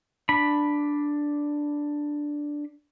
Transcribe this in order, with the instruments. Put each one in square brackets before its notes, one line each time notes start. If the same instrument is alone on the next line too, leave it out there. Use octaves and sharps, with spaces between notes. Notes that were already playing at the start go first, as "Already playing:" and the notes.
[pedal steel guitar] D4 B5